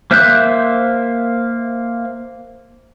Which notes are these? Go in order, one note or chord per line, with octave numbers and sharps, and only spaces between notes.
A#3 C5 E5 F#6 G6